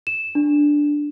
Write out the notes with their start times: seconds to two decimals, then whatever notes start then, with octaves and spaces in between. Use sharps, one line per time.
0.07 E7
0.35 D4